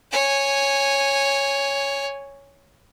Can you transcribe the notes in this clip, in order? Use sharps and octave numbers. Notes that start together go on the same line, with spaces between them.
C#5 G#5